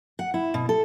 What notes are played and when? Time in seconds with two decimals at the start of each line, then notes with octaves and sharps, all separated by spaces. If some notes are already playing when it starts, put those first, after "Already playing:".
0.19 F#5
0.34 E4
0.54 B2
0.69 A4